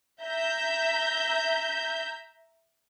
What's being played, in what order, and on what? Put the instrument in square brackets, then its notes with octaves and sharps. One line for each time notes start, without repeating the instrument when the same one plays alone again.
[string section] E5 A#5 G6